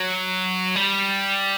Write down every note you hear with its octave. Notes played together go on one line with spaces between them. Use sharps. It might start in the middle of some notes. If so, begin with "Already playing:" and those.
Already playing: F#3
G3